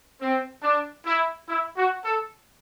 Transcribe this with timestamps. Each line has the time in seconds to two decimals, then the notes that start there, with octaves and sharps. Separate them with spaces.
0.20 C4
0.63 D4
1.06 E4
1.48 E4
1.76 F#4
2.04 A4